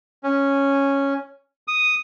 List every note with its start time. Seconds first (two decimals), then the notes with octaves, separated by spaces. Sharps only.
0.23 C#4
1.68 D#6